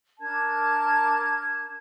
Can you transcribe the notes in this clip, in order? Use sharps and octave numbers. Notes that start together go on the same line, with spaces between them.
D4 A#4 A5 G#6